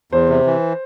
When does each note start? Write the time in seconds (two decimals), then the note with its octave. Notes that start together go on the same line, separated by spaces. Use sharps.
0.12 E2 C5
0.29 C3
0.45 E3